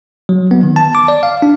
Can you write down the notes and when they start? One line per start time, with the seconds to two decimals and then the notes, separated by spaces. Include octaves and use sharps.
0.29 F#3
0.51 B3
0.63 D#3
0.76 A5
0.95 D6
1.08 D5
1.23 F5
1.42 D4